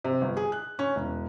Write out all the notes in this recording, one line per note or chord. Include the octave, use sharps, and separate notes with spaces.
C3
G1
G#4
F#6
C#4
E1